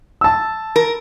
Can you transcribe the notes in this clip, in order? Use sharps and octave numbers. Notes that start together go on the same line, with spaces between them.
A5 E6
A#4